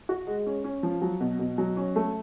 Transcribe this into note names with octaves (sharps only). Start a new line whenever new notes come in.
F#4
G#3
C#4
C#4
F3
F#3
B2
B2
F#3
C#4
A3